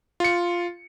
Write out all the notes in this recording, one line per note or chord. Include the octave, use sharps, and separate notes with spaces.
F4 C#7